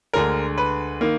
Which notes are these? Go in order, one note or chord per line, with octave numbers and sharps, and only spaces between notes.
D2 D3 G#3 A#4
B4
D#3 A#3